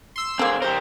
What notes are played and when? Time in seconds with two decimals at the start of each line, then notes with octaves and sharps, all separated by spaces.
0.16 C6 E6
0.39 D3 A#3 C4 G#4
0.62 G4 A#4 C5